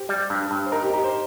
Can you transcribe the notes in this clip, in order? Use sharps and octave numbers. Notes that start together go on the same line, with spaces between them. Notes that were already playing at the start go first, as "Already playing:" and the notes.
Already playing: G4 C5
G3
G2
G2
C5
D#4 A#4
G4
D#4 G4
C5